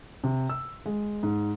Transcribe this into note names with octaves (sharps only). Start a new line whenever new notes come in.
C3
E6
G#3
G#2